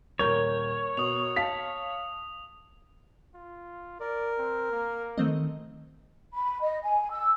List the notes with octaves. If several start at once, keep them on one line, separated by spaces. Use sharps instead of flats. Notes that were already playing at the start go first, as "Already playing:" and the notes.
D#1 A#4 C#5 G6
B2 D#6 F7
F5 A5 B6
F4
A#4 D5
C4
A#3
D#3 A3 C4 D#5
B5
D#5
G#5
E6